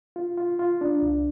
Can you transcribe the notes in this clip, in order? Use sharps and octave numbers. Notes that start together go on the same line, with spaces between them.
F4
F4
F4
D4
C2